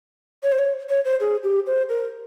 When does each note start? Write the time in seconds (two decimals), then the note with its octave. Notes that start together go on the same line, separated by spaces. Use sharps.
0.43 C#5
0.52 C5
0.59 C#5
0.90 C#5
1.05 C5
1.20 G#4
1.43 G4
1.67 C5
1.89 A#4